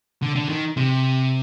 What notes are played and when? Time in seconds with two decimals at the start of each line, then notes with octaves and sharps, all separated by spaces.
0.22 D3
0.36 D3
0.49 D#3
0.77 C3